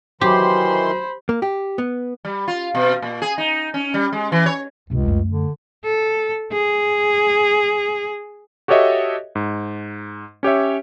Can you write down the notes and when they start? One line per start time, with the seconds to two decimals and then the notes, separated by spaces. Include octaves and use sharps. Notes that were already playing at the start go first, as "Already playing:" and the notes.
0.21 D#3 E3 F#3 G4 C5 B5 C6
1.29 A#3
1.42 G4
1.78 B3
2.25 G3
2.48 F4
2.75 B2
3.02 A#2
3.22 G#4
3.38 D#4
3.74 C#4
3.94 G3
4.12 G#3
4.32 E3
4.46 C#5
4.90 C#2 G2 C3
5.05 F#2 A3
5.28 D3
5.84 A4
6.52 G#4
8.68 F#4 G4 A4 C#5 D#5 E5
9.35 G#2
10.43 C#4 G4 C#5 E5